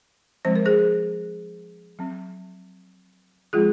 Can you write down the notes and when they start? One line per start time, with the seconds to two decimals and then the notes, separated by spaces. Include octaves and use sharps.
0.45 F3 G#3 C4 C5
0.56 A#4
0.65 G#4 C5
1.99 F#3 C4
3.53 F3 G#3 C4 F4 G#4